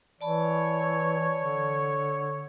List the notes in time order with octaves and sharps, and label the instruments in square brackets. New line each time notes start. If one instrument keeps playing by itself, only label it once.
[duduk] E3 [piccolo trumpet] C#5 [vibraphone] D5 A5 B5
[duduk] D3